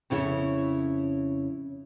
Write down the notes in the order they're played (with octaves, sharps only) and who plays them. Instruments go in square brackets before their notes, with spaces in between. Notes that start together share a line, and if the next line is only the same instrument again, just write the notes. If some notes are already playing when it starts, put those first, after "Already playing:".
[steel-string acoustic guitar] F2 C#3 E4 A4 C#5